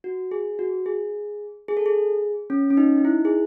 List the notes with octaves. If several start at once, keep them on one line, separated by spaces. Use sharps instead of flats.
F#4
G#4
F#4
G#4
G#4
A4
G#4
C#4
C#4
D#4
D#4
E4
G#4